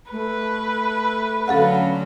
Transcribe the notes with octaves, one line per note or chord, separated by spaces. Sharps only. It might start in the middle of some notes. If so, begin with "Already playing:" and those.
A3 B4
D3 F#3 C#4 A4 F5 F#5